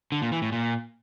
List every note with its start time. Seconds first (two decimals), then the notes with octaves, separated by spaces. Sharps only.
0.12 D3
0.22 A#2
0.32 E3
0.42 A2
0.52 A#2